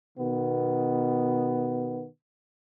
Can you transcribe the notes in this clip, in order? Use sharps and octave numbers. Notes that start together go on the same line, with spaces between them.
B2 D#3 B3